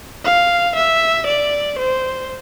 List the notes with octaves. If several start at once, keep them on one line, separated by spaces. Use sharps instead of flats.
F5
E5
D5
C5